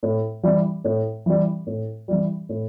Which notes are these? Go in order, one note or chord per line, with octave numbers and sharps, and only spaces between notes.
A2
E3 G3
A2
E3 G3
A2
E3 G3
A2